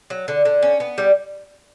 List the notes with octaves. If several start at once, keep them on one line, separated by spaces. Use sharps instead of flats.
F#3
D3
D3
C#4
B3
G3